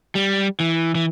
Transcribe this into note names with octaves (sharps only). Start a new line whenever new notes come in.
G3
E3
E3